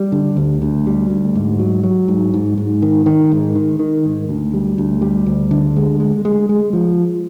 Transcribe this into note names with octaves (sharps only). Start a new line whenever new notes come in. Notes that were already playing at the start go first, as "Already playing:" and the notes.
Already playing: G3
D3
D2
D2
G3
D2
G#2
F#3
F#3
G#2
G#2
G#2
D#3
D#3
G#2
D#3
D#3
G#2
D2
G3
D2
G3
D2
D3
G#3
G#3
G#3
G#3
F3